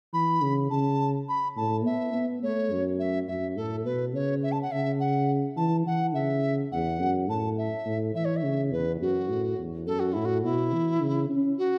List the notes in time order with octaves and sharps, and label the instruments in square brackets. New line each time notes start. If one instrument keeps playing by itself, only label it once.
[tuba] E3 [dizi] B5
[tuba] C#3
[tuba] C#3 [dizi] A5
[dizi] B5
[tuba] A2 [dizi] A5
[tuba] B3 [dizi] E5
[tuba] B3
[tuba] A3 [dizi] C#5
[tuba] F#2
[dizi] E5
[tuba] F#2 [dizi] E5
[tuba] A2 [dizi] A4
[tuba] B2 [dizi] B4
[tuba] C#3 [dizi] C#5
[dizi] E5
A5
F#5
[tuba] C#3 [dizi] E5
[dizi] F#5
[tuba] E3 [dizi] A5
[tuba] E3 [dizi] F#5
[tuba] C#3 [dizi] E5
[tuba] E2 [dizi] F#5
[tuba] F#2
[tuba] A2 [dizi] A5
[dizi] E5
[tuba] A2
[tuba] E3 [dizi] E5
[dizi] C#5
E5
[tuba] C#3
[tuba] E2 [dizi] B4
[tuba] F#2 [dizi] F#4
[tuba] A2
E2
[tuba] F#2 [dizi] A4
[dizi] F#4
[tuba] A2 [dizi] E4
[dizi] F#4
[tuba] B2 [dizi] E4
[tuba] E3
C#3
C#4
[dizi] F#4